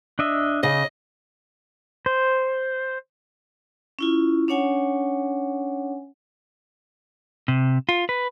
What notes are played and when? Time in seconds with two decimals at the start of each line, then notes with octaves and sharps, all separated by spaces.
0.19 D4 D#5 E5
0.63 C#3 D#5
2.06 C5
3.99 C#4 E4 F4
4.48 C#4 D4 C#5 F#5 G#5
7.48 C3
7.89 F4
8.09 B4